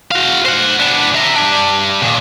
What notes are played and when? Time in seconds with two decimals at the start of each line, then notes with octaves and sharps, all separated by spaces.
0.11 F#4 F5
0.46 C5 F#5
0.79 B3 D4
1.15 E5 A#5
1.36 D4 G4
2.03 A#2 D#3